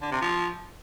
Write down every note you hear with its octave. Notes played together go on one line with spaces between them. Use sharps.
D3
C3
F3